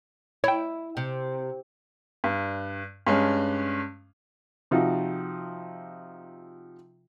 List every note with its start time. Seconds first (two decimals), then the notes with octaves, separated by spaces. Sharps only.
0.44 E4 C#5 G5
0.97 C3
2.24 G2
3.07 G2 G#3 C#4
4.71 C3 F3 D#4 F4 F#4